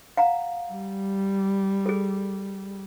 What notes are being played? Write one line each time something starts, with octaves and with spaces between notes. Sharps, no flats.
F5 F#5 A#5
G3
G#4 A4